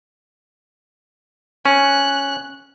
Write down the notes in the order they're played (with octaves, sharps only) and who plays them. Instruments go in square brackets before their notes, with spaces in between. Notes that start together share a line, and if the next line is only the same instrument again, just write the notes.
[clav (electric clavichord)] C#4 [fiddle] F#6